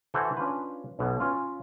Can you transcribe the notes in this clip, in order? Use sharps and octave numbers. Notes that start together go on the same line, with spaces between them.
E3 F#4 A4 C5
C#4 D4 F4 B4
B1 E2 B2
C#4 F4